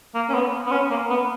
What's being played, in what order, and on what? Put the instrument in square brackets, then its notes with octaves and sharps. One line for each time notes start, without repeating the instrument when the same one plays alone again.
[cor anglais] A#3
C#4
B3
B3
C#4
A#3
B3